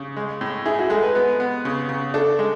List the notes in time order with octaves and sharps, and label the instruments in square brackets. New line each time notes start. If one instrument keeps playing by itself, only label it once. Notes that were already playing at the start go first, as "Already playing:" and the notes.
Already playing: [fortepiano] C#3
G#3
A2
[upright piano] E4 [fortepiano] G#4
[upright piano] F#4
[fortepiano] G#3 [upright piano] A4
[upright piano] B4
[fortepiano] B3
B3
C#3
C#3
[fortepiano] D4 [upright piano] A4
[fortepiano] G#3